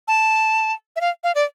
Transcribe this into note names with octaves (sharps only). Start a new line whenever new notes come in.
A5
E5
F5
F5
D5